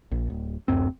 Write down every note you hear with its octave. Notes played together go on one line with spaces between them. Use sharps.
A#1
D1
D1 F#2 C4